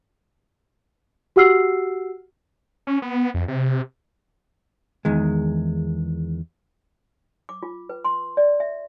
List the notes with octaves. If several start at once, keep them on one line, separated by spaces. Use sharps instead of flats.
F#4 G4 F#5 E6 F6 C7
C#4
B3
F2
C3
E2 D#3 G#3
D6
F4
B4
C6
D5
E5